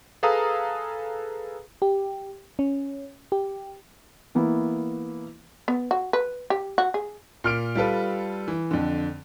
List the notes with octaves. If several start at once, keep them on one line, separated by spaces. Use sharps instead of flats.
G#4 A4 B4 F5 A#5 D#6
G4
C#4
G4
E3 A#3 B3 E4
B3
F#4
B4
G4
F#4
G#4
A#2 F6 D7
G3 F4 A4 B4
E3
F2 D3